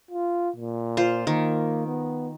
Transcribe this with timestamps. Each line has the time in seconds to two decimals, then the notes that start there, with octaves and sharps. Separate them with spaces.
0.10 F4
0.56 A#2
0.97 F4 C5
1.27 D#3 A#3
1.86 B3